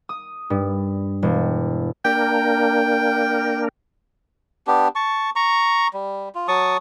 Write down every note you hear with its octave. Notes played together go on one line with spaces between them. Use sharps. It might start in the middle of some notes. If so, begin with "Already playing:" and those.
D#6
G2
E1
A#3 D4 A#4 G5
B3 D4 G4
A5 C#6
A#5 C#6
G3
F4
F#3 A5 C#6 D#6